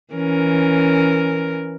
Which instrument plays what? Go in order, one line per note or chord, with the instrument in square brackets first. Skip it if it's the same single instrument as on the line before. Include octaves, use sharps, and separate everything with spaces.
[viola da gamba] E3 C#4 A#4